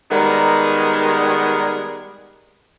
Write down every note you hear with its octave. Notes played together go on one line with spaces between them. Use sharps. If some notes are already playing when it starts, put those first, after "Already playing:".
D#3 G3 G#3 B3 A#4